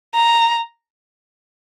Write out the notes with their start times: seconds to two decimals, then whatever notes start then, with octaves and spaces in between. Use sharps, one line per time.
0.14 A#5